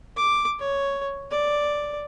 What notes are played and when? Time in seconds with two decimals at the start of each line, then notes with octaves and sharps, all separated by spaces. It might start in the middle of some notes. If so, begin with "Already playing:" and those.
0.17 D6
0.59 C#5
1.31 D5